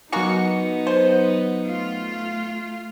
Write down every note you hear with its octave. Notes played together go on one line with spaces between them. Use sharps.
F#3 G#3 A#3 B3 D#4 F#4 F#5 C#7
C5
A3 F4